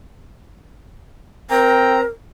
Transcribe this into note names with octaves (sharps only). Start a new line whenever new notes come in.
C4 A#4 G5 A#5